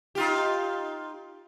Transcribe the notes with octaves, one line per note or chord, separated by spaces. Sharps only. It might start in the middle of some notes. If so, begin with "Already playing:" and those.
D#4 F4 G4